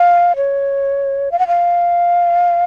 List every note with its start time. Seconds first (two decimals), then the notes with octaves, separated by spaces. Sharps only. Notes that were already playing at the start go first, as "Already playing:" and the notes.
Already playing: F5
0.36 C#5
1.32 F5
1.39 F#5
1.47 F5